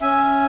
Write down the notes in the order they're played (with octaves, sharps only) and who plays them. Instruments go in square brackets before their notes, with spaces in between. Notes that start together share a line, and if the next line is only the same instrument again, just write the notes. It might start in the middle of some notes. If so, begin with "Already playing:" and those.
[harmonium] C#4 E5 G#5